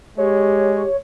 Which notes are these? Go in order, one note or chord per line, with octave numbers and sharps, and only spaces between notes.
G#3 G4 C#5